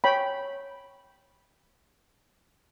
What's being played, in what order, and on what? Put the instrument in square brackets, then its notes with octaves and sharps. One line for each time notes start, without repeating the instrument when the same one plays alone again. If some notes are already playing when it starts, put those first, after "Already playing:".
[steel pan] C#5 G5 B5